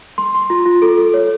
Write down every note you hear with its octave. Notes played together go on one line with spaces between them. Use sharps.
C6
C6
F4
F4
A4
A4
C#5